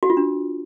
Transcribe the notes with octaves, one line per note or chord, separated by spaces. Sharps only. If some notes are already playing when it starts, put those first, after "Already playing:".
F#4
F4
D4